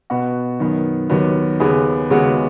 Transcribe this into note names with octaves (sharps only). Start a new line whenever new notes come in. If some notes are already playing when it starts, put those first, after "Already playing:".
B2 B3 F#4
F#2 D#3 B3
D#2 D#3 F#3 B3
D#2 C#3 B3 G#4 B4
D#2 C#3 G#3 B3 F#4